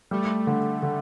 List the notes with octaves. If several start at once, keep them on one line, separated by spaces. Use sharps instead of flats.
G3 A3
D3
D3